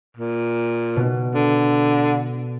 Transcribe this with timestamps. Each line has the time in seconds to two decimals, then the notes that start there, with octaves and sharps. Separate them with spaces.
0.17 A#2
0.96 B2
1.34 D3